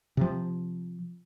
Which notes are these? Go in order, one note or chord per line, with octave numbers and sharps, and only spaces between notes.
C3 F3